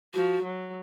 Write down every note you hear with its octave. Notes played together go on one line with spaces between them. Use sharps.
F3 F#4
F#3